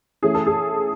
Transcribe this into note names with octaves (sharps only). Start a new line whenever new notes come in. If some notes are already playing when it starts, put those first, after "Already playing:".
E3 A3 C#4 G#4
A4
G#4